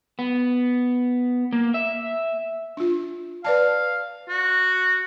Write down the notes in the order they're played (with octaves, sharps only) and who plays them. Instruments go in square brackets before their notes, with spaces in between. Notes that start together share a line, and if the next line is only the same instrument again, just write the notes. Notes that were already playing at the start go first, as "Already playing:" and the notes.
[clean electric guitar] B3
A#3
E5
[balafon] D4 F4
[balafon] B4 D5 A5 [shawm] F5
[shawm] F#4